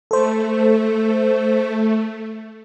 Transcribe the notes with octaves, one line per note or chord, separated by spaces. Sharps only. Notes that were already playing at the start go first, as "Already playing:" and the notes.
A3 A4 C5